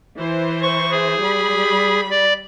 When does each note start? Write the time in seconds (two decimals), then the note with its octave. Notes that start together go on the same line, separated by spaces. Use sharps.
0.18 E3 C5
0.62 C#6
0.91 G#4
1.21 G3 B5
2.11 D5